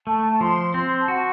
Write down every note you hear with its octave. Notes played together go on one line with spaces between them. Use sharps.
A3 A5
F3 C6
C4 C6
A5
F#4 F#5